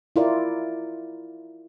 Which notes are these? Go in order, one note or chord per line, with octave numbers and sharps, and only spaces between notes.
E4 F4 A#4 D5